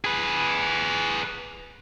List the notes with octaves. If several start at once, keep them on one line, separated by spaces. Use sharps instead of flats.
G#4 B4